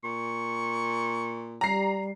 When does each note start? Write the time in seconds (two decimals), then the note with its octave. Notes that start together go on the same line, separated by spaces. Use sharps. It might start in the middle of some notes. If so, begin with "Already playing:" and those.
0.04 A#2 C#6
1.61 G3 A#5 C7